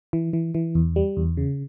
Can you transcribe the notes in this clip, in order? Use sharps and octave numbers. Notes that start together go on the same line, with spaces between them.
E3
E3
E3
E2
G3
E2
C#3